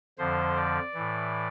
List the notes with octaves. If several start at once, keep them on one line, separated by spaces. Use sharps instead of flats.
F2 D3 F3 C5
D5
A2 E3